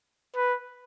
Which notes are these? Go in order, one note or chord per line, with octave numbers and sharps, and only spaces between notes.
B4